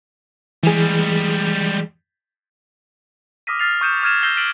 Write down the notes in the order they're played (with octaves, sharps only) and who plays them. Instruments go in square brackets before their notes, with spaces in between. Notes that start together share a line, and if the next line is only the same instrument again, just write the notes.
[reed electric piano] E3 G#4 [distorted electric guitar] G3 G#3
[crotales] D6 D#6 F6 A#6 B6 D#7
F6 A6 C7 F7
C#6 D#6 G6 C#7 D#7 E7
D6 F6 G#6 D#7 E7
E6 G6 A6 A#6 C7 G7
F6 A6 B6 D7 D#7 F#7